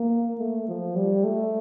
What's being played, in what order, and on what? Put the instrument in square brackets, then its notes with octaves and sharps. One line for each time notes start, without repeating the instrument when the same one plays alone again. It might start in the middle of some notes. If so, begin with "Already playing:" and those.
Already playing: [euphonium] A#3
A3
F3
G3
A3